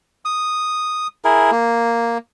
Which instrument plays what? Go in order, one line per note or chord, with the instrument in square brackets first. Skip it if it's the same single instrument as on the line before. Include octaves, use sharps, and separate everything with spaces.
[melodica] D#6
E4 G#4 A#4
A#3